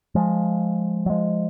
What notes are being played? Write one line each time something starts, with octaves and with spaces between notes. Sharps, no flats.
F3 G#3
F#3
F3 G#3